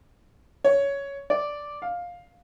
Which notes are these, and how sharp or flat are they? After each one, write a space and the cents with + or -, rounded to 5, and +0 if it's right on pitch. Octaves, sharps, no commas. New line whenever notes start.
C#5 +10
D5 +0
F5 +10